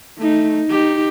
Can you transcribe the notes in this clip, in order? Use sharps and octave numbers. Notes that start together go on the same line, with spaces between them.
A3 D#4
D#4 G4